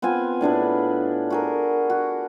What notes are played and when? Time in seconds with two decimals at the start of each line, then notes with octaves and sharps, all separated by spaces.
0.02 B3 C4 F4 G#5
0.41 A2 D4 G#4 B4
1.30 F#4 G#4 A#4
1.90 F#4